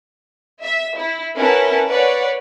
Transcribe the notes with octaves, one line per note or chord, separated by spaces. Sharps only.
E5
E4
C#4 E4 A#4 B4 F#5 A5
B4 C#5 D5 F#5